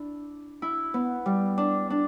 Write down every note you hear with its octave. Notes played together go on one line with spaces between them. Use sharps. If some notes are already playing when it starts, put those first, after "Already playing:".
Already playing: D4 E4
E4
B3
G3
D4
D4